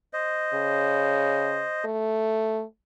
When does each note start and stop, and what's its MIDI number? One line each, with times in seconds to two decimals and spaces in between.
0.13 1.85 72
0.13 1.85 75
0.54 1.65 49
1.85 2.63 57